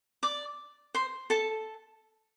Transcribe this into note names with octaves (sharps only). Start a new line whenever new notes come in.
D5 D6
C5 C6
A4 A5